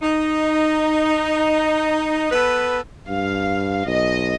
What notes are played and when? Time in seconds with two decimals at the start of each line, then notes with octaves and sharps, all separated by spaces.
0.02 D#4
2.31 B3 A4 B4
3.08 G2 F5
3.87 B1 D#5